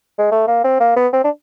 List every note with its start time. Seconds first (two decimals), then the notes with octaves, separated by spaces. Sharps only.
0.19 G#3
0.31 A3
0.48 A#3
0.64 C4
0.80 A#3
0.96 B3
1.13 C4
1.24 D4